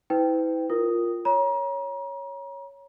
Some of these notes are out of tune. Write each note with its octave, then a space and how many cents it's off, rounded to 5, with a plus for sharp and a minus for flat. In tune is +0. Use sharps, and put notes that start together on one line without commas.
E4 -30 B4 +40 G5 +0
F4 +0 A#4 +0 D#6 +0
C#5 +0 A#5 +35